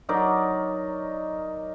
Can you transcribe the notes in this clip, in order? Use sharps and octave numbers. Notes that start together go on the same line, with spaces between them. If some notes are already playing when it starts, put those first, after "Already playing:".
F#3 D#4 A#4 D5